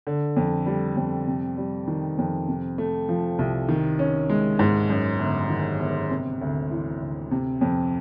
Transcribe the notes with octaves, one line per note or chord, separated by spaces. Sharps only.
D3
F2
G3
F2
C3
G3
D#3
F2
C3
A3
F3
C2
D#3
C#4
G#3
G#2
F#2
G1
D#3
G1
C3
D2
E3
D2
C3
F2